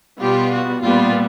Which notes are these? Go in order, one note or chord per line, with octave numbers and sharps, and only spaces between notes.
B2 G3 B3 F4 G4
F#4
A#2 G3 B3 F4